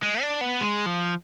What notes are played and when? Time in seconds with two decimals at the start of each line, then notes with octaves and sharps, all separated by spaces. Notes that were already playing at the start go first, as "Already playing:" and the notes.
0.03 G#3
0.22 D4
0.41 B3
0.61 G#3
0.86 F3